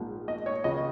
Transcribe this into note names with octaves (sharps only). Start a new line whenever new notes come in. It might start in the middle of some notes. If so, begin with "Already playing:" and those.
Already playing: A#1 G#2 F3
D#5
C#5
C#2 C#3 F3 G#3 D#5